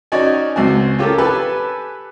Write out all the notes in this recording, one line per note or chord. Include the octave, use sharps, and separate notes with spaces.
C#4 D#4 F#4 D5 G#5
C#2 C4 F#4 G#5
C#4 F4 G4 A4 A#4
G4 A4 B4 G#5